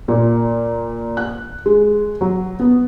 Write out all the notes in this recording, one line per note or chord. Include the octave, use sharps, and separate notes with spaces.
A#2
F#6
G#3
F#3
B3